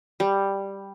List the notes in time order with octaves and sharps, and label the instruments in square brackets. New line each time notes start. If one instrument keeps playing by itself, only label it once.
[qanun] G3